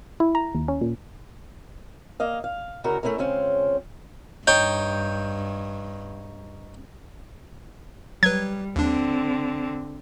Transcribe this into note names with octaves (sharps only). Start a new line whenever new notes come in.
E4
A#5
D#2
C#4
A#2
A#3 D#5 F5
F5
D2 C#3 E4 F#4 A#4
A3 C4 C#4 E4 A#4
C#3 G#3 C4 C#4 F4
G2 D#4 C#5 G5 G6
F#3 G3 B4 G#6
D#2 D3 C4 D4